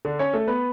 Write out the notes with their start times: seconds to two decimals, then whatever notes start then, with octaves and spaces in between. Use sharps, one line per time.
0.05 D3 D4
0.19 C#4 C#5
0.34 A3 A4
0.47 B3 B4